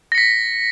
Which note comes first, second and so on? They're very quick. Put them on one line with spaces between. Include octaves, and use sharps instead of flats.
A#6 C#7 B6